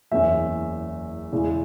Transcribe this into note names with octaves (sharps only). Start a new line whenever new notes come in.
F#1 E2 E3 C#4 E5
E2 C#3 E3 G#3